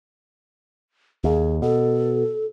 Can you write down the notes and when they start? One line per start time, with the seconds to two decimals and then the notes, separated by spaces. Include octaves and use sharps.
1.24 D#2 G#4
1.62 B2 A4